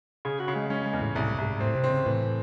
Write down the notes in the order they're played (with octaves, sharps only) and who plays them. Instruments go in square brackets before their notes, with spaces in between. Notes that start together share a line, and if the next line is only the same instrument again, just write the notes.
[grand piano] C#3 [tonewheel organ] G#4
[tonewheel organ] F#4
[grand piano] C#3
[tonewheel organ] G#3
[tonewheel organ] G#3 [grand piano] C#4
[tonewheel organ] G#3
[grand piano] E2
[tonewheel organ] A2
[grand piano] C2 [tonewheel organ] A2
[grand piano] C2 [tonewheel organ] G#2
[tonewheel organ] G#2
[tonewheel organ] A2 [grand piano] C4
[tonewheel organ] C3
[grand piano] C4
[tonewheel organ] C#3
[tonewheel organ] A2 [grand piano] E3